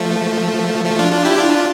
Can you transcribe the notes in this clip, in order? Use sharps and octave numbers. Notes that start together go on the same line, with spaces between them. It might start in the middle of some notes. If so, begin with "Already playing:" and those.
Already playing: F3 A3
F3 A3
D4 F4
D4 F4
E4 G4
D4 F4